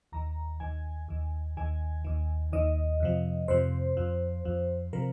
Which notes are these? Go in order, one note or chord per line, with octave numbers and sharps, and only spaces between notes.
D#2 D#3 A#5
D#2 D#3 G#5
D#2 D#3
D#2 D#3 G#5
D#2 D#3
D#2 D#3 D#5
F2 C3 F3
F2 C3 F3 C5
F2 F3
F2 F3
C3 F3 A#4